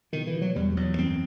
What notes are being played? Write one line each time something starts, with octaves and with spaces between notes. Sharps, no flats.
B2 D#3
E3
B2
F#3
E2 G3
G3
E2 F#3
F#2 C4